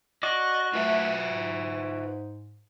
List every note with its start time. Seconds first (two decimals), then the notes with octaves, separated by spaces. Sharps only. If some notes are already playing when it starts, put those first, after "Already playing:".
0.23 F#4 D5 D#5 D6
0.74 A3 F4 B4 E5
1.27 G#2